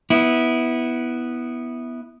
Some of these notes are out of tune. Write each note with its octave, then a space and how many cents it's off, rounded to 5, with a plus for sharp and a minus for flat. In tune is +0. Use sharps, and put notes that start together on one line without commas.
B3 +0 E4 -15